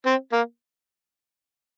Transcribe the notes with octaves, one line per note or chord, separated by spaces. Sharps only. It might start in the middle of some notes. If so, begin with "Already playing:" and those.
C4
A#3